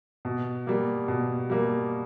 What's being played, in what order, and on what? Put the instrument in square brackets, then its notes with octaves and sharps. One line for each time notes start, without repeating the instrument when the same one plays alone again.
[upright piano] B2
G3 A#3
B2
G3 A#3